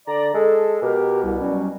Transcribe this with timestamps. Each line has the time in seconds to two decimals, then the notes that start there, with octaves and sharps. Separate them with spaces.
0.07 D3 D5 A#5
0.34 G#3 A4
0.82 B2 G4 A#4
1.23 C2
1.40 F#3 G3 C#4